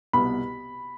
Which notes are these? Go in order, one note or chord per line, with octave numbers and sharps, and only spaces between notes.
C2 B2 B3 B5